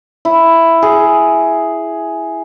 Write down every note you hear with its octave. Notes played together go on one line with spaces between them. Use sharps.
E4
G#4